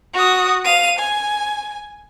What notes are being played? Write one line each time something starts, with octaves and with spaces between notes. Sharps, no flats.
F#4 D#6
F5 D#7
G#5